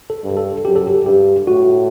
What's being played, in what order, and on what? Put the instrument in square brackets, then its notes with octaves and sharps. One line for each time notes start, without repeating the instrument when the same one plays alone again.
[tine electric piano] A4
[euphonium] G2
[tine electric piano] A4
[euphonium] F#2 [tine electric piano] G4
[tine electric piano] A4
G4
[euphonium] G2 [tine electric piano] G4
[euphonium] A2 [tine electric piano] F#4